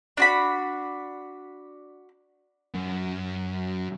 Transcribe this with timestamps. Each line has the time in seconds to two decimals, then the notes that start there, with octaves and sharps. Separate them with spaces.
0.17 D4 F#4 B5
2.75 F#2